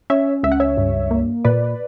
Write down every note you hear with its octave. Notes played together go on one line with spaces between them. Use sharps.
C#4 C#5 E5
C#2 E5
F#5
C#5 E5
G2
A#3
A#2 B4 D5